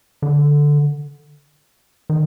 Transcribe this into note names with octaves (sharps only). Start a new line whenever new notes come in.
D3
D#3